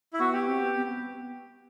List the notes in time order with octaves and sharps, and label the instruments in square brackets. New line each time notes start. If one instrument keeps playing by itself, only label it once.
[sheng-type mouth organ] E4
[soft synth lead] B3 [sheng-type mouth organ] F#4
[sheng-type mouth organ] G4
[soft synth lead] C4
B3
B3
B3